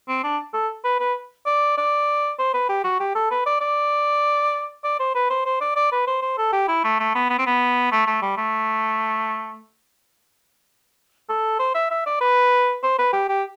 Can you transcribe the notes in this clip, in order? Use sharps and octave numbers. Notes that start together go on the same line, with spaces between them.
C4
D4
A4
B4
B4
D5
D5
C5
B4
G4
F#4
G4
A4
B4
D5
D5
D5
C5
B4
C5
C5
D5
D5
B4
C5
C5
A4
G4
E4
A3
A3
B3
B3
C4
B3
A3
A3
G3
A3
A4
C5
E5
E5
D5
B4
C5
B4
G4
G4